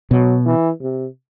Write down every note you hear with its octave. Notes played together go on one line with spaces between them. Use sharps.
B2 F#3
E3
C3